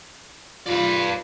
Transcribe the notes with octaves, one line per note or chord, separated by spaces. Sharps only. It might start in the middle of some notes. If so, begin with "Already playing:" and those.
F4 B4 D5